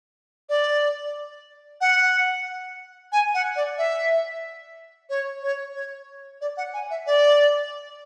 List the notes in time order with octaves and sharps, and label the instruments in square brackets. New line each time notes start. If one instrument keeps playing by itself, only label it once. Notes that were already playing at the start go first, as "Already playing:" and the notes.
[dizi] D5
F#5
G#5
F#5
D5
E5
C#5
C#5
C#5
D5
F#5
G#5
E5
D5